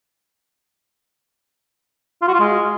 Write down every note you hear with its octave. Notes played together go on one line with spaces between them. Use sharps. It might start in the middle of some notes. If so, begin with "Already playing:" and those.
F4
F#4
F4
G#3